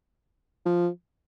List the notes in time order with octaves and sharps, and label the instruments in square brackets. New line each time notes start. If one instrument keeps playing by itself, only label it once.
[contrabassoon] F3